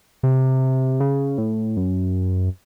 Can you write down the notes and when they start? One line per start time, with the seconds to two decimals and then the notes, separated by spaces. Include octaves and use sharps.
0.23 C3
1.00 C#3
1.38 A2
1.77 F#2